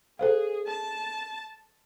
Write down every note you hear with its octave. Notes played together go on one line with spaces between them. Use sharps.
G#4 A4 C5 F5
A5